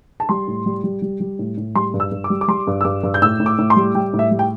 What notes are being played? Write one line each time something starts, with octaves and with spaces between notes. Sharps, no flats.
A5
G3 C6
A2
G3
G3
G3
G3
A2
A2
G3 C6
G2
E6
G2
D6
G3
D6
G3 C6
G2
E6
G2 D6
G2
G6
A2 E6
A2
D6
A2
C6
G3
G3 G5
A2
E5
G3
G5